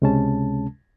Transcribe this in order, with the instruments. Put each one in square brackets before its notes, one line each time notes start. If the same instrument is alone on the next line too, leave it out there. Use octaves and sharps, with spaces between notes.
[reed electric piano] C#2 C3 G#3 C#4 A5